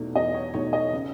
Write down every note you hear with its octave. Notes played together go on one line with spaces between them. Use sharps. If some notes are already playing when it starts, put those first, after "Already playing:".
Already playing: E2 B2 A3 D#4
E2 D#5
C#5
B2 A3 D#4 C#5
D#5
C#3